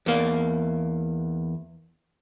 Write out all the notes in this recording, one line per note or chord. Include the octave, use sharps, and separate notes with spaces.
E2 A#3